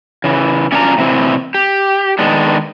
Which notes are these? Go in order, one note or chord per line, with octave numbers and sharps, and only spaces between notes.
C#3 E3
C#4 D4 F4 F#5 A#5
A2 C3 E3 C4
G4
D#3 G#3 B3 D4